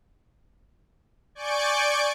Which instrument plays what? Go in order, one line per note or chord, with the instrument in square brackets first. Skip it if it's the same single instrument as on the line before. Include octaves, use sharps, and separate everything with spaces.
[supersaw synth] D5 G#5 C#6 D6 G6 D7